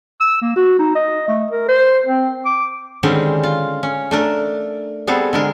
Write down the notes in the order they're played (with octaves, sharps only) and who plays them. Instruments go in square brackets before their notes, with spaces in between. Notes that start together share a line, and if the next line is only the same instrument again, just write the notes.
[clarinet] E6
A#3
F#4
D#4
D#5
A3
A#4
C5
C4
D6
[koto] D3 D#3 G3 G#3 C4 C#4
F4
C#4
A3 D4 A#4
G3 B3 C4 G#4 A4
D3 G#3 A#4